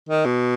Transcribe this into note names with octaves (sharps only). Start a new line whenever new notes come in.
D#3
B2